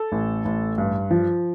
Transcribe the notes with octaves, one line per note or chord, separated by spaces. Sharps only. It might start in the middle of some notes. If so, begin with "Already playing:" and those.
Already playing: A4
A1
A1
G2
F3